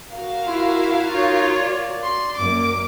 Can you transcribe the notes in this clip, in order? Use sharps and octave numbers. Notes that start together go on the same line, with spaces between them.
F#4 A#4 F5
E4 F4
D#4 F4 C#5
D5
C6
F#2 A#3 D6